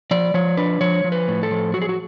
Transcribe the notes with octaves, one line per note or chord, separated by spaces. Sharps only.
F3 D5
F3 C#5
D4 B4
F3 C#5
F3
B4
A2
A4
F3
F#3 F#4
G#4
F#4